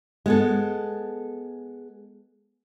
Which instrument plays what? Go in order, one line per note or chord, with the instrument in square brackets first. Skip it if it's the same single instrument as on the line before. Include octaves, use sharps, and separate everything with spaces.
[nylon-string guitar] G#3 B3 A4